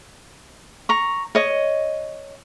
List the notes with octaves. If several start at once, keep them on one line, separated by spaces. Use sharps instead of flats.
A#5 C#6
C#5 D#5